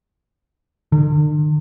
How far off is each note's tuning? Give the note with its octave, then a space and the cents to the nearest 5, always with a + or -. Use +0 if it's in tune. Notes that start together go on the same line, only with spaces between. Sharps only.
D3 +45